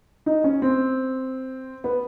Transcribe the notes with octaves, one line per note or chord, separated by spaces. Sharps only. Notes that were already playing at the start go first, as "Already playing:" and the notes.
D#4
C#4
C4
B3